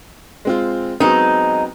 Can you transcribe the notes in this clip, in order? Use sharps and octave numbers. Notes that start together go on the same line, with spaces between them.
G#3 C4 F4
F#3 G#3 B3 C4 D#4